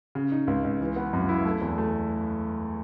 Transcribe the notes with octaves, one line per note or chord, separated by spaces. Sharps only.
C#3
D#4
C#2
C#2
E3
B3
F#2
E4
A3
E2
A3